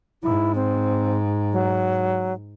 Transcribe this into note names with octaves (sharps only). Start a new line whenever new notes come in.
G#2 E4
C4
F#3